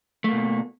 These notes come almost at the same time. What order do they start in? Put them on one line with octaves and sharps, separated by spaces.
A3 A#3 B2